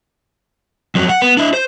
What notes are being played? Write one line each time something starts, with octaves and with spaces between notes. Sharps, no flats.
F2 F#3
F#5
B3
D4 E4
C5